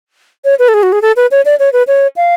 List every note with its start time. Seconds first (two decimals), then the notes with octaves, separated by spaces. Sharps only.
0.45 C#5
0.59 B4
0.68 A4
0.74 G#4
0.83 F#4
0.92 G#4
1.02 A4
1.16 B4
1.31 C#5
1.45 D5
1.59 C#5
1.73 B4
1.87 C#5
2.16 F5